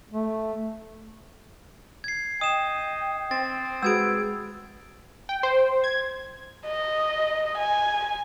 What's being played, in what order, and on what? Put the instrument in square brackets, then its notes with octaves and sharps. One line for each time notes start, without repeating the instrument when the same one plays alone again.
[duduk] A3
[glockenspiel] G#6 C7
[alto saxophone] D#5 [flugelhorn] G5 [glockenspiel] D#6 E7
[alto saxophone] C4 [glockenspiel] A6
[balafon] G#3 F#4 G#4 [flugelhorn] B4 [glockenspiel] E6 G#6 D7
[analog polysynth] G5
C5
G#6
[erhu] D#5
G#5